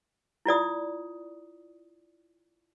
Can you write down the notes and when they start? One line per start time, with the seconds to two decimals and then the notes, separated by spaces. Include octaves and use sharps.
0.45 E4 F4 D5 D#6